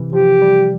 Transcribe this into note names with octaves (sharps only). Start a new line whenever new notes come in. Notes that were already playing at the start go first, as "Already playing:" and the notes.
Already playing: C3 E3
F3 G4
G3